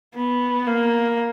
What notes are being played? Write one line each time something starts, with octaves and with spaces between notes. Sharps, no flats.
B3
A#3